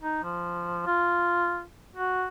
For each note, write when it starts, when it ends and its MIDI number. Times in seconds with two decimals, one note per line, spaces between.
0.02 0.20 63
0.23 0.85 53
0.87 1.63 65
1.96 2.27 66